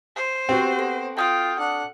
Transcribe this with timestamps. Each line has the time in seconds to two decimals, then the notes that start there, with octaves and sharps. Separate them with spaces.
0.16 C5
0.49 B3 C4 F#4 G4
0.79 B3 A4
1.17 F4 A4 G5 D#6 F6
1.59 D4 F#5